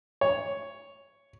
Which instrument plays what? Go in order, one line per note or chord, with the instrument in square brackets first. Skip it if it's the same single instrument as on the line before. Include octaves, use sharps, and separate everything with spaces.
[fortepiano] C#5